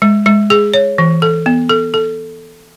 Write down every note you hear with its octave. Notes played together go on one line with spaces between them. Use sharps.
G#3
G#3
G#4
C#5
E3
A4
B3
A4
A4